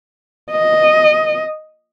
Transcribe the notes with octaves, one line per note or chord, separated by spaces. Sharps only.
D#5